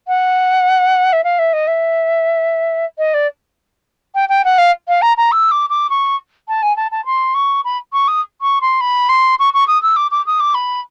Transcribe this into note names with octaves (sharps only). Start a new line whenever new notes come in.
F#5
E5
F5
E5
D#5
E5
D#5
D5
G5
G5
F#5
F5
F5
A#5
A#5
E6
D6
D6
C#6
A5
G#5
A5
A5
C6
C#6
B5
C#6
D#6
C#6
C6
B5
C6
C#6
C#6
D#6
E6
D6
D6
D#6
D6
B5